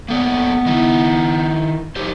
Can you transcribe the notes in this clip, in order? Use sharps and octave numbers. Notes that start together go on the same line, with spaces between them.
A#3 B3 A4 D5
D#3 D#4 E4
D#4 G4 C5